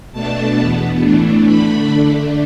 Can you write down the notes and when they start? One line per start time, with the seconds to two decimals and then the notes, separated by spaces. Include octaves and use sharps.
0.12 B2 A3 D4 A5
0.56 E2 B2 B3
1.01 A2 E3 A3 D4
1.45 D3 A3 D4 B5
1.90 D3 A3 D4